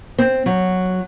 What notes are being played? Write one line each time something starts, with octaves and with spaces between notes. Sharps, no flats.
C4
F#3